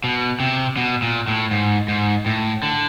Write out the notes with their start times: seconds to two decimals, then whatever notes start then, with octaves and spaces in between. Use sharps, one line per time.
0.04 B2
0.40 C3
0.77 B2
1.02 A#2
1.28 A2
1.51 G#2
1.88 G#2
2.26 A2
2.63 D3